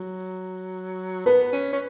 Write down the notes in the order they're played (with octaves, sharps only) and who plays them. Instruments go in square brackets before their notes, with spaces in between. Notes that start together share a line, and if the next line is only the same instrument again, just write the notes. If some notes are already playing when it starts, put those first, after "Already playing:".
Already playing: [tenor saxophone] F#3
[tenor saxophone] B3 [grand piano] B4
[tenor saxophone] C#4
C#4